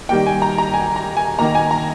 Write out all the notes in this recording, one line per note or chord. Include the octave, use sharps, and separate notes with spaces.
D#3 G3 A#3 G5
G#5
A#5
A#5
G#5
A#5
G#5
D#3 A#3 A#5
G#5
A#5